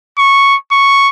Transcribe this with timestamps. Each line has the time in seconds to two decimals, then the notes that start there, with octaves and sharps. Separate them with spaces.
0.18 C#6
0.72 C#6